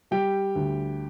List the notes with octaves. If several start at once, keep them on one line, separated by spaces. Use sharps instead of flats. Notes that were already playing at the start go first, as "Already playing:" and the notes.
G3 G4 G5
D2